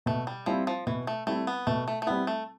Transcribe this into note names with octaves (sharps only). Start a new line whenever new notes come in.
B2 A3
G3
F3 G3 C4 E4
F3
B2 E3
A3
G3 A3 C4 E4
B3
B2 A3
A3
A3
G3 B3 C4 E4
A3